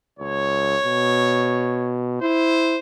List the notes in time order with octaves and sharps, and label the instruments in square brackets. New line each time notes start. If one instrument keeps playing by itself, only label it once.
[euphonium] C#2 [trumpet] C#5
[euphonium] B2
[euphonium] E4 [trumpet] C5